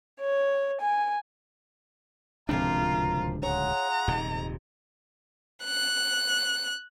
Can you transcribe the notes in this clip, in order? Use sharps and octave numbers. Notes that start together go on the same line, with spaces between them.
C#5
G#5
D1 C#2 C3 F3 D4 F4 A#4 A#5
F4 G#4 C#5 F#5 A#5
D#1 G#2 C3 D#4
F#6